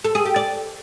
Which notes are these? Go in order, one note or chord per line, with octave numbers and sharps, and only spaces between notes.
A4
G#4
G4
D5